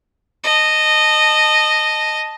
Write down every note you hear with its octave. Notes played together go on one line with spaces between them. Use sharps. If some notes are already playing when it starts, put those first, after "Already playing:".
D#5 A5